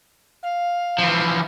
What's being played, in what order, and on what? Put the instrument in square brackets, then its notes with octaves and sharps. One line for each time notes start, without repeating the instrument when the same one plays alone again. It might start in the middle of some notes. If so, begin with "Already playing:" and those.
[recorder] F5
[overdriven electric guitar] E3 F3